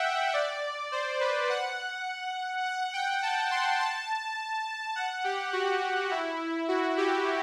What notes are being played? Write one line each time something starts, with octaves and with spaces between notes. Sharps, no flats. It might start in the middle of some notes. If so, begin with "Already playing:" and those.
Already playing: E5 F#5 G5
D5
C5
B4
F#5
F#5
G5
A5
C6
A5
F#5
G4
F#4
E4
F#4
G4